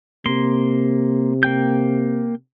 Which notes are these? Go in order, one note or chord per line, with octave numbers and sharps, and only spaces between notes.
C3 A#3 C6
A#3 G5 G6